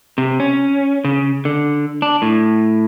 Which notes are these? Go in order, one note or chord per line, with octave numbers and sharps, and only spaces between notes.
C3
C#4
C#3
D3
D4
A2